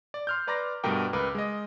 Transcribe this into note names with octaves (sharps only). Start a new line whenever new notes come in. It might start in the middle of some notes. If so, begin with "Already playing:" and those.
D5
C6 F6 G6
B4 D5 A#5 C6 D6 A#6
G2 B2 A3 A#4 G5 D6
C#2 A#4 B4 D6
G#3 D#5